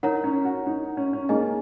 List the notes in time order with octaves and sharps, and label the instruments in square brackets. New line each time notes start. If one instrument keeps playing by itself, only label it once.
[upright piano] D#4 [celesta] A#4 C#5 F#5 A#5
[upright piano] C#4
F#4
D#4
C#4
C#4
[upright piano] A#3 [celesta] D#4 G#4 D#5 G#5